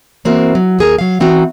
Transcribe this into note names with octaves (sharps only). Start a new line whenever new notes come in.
E3 A#3 C4 F#4 A#4
F#3
D#2 G#4 A#4
F#3 F5
E3 C4 D#4 F#4 A#5